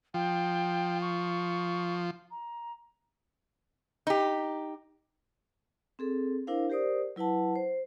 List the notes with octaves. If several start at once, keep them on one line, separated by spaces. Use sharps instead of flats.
F3 G5
C#6
A#5
D#4 G4
C4 G#4 A4
D4 E4 A#4 C5 F5
G4 A#4 C5 D5 D#6
F#3 E4 B4 F#5 A5
C5